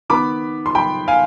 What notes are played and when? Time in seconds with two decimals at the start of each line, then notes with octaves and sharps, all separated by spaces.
0.09 D#3 B3 B5 D6
0.66 C6
0.75 G5 B5
1.08 F5 G#5